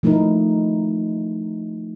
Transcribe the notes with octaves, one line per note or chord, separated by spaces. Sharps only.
F3 A3 D#4 E4 A#4